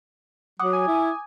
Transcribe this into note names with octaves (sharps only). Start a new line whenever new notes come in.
F#3 F#5 D6 D#6
G#5
E4